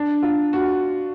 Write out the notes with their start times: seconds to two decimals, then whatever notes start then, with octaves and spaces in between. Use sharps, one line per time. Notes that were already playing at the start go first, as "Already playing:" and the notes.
Already playing: D4
0.23 F4
0.53 F#4